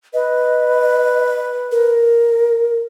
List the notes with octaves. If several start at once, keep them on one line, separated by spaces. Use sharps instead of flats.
B4 D#5
A#4